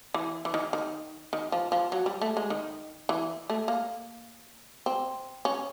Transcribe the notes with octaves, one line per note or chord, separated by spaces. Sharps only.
E3
E3
D#3
D#3
D#3
F3
F3
F#3
G3
A3
G#3
D#3
E3
A3
A#3
C4
C#4